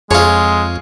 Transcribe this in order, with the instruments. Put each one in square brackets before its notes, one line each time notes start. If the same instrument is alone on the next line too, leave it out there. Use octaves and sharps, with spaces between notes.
[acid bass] F2 [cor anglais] G#3 [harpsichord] F4 C#5 [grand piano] G#4